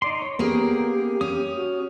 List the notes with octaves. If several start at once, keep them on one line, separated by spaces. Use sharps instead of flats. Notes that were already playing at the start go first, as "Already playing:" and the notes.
D#4 D5 C6
C#5
A#3 B3 C#4 G4 G#4 A#4
C#4 D#6
F#4